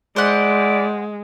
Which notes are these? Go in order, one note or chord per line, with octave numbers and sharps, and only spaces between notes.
G#3 E4 C5 D5 F#5